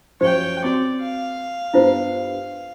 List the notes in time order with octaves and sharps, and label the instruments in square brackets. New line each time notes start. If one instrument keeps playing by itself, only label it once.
[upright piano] F#2 F3 [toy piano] F#4 C5 [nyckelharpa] C#5 G5
[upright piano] C4 [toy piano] F#4 C6 [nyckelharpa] D5
[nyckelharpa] F5
[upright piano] G2 B3 [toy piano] E4 F4 C5